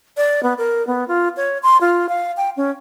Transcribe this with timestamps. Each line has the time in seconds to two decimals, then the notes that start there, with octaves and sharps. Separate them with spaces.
0.17 D5
0.43 B3
0.58 A#4
0.87 B3
1.08 F4
1.37 C#5
1.63 C6
1.81 F4
2.09 F5
2.37 G5
2.57 C#4